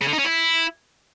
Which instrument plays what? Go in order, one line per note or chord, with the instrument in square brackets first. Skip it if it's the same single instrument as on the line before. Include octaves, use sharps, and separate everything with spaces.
[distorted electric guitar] C#3
D3
D#4
C#4
E4